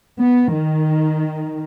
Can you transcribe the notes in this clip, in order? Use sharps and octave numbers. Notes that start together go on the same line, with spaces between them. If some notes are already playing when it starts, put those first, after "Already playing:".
B3
D#3